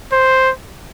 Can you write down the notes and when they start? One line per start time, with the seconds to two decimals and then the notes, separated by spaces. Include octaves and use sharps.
0.12 C5